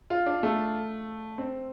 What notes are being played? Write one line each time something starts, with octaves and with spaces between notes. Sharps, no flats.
F4
D4
A3
C4